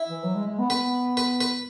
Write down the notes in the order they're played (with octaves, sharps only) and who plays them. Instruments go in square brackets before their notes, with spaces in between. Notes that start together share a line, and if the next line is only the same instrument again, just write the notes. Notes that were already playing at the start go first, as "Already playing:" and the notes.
Already playing: [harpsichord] E4
[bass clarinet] E3
F#3
G#3
G#3
B3
[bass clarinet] B3 [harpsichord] B4
[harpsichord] B4
B4